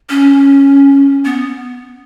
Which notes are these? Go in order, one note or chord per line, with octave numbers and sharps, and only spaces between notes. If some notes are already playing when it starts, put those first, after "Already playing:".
C#4
B3